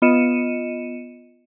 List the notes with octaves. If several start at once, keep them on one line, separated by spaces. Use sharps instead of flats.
B3 F4 D#5 C#7 D#7 E7